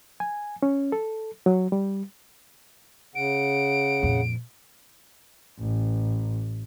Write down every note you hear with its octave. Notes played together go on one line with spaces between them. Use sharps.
G#5
C#4
A4
F#3
G3
C#3 F#5 D7
F2 A#2
A1